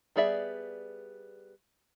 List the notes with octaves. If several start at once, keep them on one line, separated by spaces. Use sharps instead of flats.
G3 B3 G#4 D5 E5